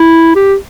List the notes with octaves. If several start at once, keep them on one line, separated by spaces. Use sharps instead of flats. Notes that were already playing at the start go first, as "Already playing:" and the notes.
Already playing: E4
G4